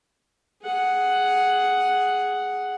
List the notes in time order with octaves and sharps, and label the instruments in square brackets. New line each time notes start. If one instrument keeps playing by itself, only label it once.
[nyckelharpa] G#4 F#5